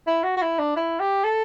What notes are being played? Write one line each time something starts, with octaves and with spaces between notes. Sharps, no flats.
E4
F#4
F#4
E4
D4
E4
G4
A4